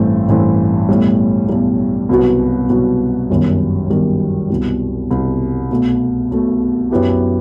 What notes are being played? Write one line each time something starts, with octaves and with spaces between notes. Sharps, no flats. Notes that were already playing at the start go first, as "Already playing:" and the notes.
Already playing: A1 G2 E3 A3 C4
A1 G2 E3 A3 C4
B1 A2 G3
B1 A2 G3
C2 B2 F#3 B3 F#4
C2 B2 F#3 B3 F#4
G1 F#2 D#3 G3
G1 F#2 D#3 G3
C2 B2 G3
C2 B2 G3
B1 B2 A3
B1 B2 A3
F#2 F#3 B3 E4 G4